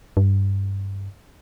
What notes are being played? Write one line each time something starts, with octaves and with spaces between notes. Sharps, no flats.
G2